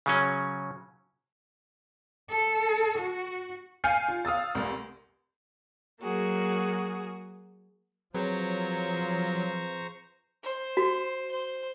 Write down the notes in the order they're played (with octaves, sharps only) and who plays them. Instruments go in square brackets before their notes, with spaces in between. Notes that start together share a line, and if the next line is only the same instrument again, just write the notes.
[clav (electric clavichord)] C#3 F#3 C#4
[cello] A4
F#4
[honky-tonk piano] F5 G#5 F6 G6 C7 C#7
F4
F5 D#6 E6 A6
F1 C2
[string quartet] F#3 A#3 F#4 G#4
[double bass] F3 [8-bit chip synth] F#3 [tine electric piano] C4 G#4 B4 [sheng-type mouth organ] C5 A#5 C#6
[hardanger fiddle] C5
[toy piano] F#4
[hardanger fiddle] C5